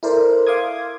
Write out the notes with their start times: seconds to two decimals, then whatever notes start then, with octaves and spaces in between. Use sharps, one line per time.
0.03 E4 A4 A#4 C5 D5
0.47 E5 F5 C6 D6 D#6 G#6